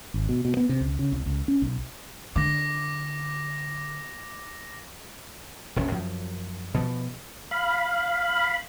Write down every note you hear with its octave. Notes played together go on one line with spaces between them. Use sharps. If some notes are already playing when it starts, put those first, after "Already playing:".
G#1
B2
B2
B3
C3
C#2
C#3
C2
C#2
C#4
B1
D3 D6 A#6
E1 A#1 C3 C#4
F#2 F3
B2 F3
F5 B5